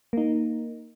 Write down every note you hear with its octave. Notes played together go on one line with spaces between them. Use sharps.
A#3 D#4